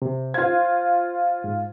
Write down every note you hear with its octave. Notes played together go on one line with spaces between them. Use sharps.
C3
F4 C5 F5 G#6
G#2